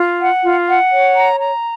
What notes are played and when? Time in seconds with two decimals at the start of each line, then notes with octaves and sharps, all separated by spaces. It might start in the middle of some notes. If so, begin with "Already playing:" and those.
Already playing: F4
0.18 F#5
0.42 F4
0.67 F#5
0.91 C#5
1.16 A#5
1.39 A#5